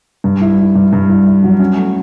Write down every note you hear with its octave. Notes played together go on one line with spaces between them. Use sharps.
G2
E4
E4
G2
G2
E4
E4
F#3
C#4
A3